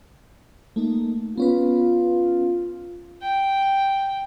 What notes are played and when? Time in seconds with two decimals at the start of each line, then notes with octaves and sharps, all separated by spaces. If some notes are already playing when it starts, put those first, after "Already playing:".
0.76 A3 A#3 D#4
1.38 B3 C#4 F4 B4
3.22 G5